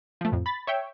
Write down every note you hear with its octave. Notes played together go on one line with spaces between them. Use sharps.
F3 A3
F2 A2
B5 A6
C#5 E5 G5